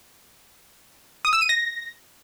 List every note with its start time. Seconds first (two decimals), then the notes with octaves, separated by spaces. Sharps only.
1.25 D#6
1.33 E6
1.41 D#7
1.49 A#6